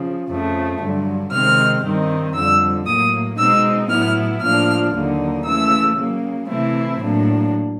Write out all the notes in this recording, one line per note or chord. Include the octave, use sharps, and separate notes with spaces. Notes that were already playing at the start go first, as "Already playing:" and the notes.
Already playing: C#3 F3
F2 C#3 F3 A3
G2 D3 F#3
C3 D#3 G#3 C4 F6
G2 D#3 G3 C4 D#4
F2 D3 G3 E6
A2 F#3 A#3 D#6
B2 G#3 C4 D#4 E6
A2 F#3 B3 E4 F6
A2 F3 A#3 D4 F6
D#2 D3 F#3 A#3 D#4
C#3 E3 A3 E6
C#3 F#3 A#3
C3 E3 A3 C4 E4
A2 F#3 A#3 D4